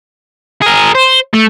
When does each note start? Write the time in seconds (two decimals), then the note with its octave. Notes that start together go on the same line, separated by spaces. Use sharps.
0.62 G#4 A#4
0.95 C5
1.34 A3